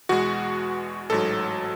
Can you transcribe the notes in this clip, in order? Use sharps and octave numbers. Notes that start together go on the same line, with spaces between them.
E2 B2 G#3 F#4
A1 G#2 F#3 A4